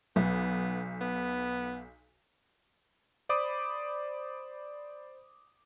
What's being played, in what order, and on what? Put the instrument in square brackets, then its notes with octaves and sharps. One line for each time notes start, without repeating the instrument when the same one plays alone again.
[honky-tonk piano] B1 [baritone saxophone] B3
[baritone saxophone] B3
[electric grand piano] C5 D5 B5 D6 D#6